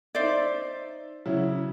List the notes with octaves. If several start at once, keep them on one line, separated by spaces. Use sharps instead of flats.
D#4 C5 D5 E5
C#3 F#3 E4